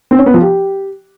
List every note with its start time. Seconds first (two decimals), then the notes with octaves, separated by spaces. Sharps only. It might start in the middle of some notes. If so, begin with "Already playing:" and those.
0.11 C4
0.19 C#4
0.26 B3
0.34 F3
0.42 G4